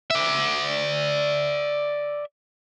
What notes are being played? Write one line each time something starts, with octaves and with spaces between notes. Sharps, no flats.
D5 E5